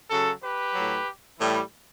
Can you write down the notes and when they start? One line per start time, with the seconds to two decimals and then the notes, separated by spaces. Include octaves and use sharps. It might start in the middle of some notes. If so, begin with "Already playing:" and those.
0.10 C#3 F#3 F#4 A4
0.42 G4 B4
0.75 A2 F#3
1.38 A2 E3 G3